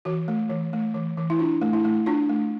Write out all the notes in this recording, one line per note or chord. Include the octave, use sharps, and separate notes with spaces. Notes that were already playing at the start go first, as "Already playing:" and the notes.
E3 F#4
A3
E3
A3
E3
E3
E4
D4 F4
A3
E4
A3
D4 F4
A3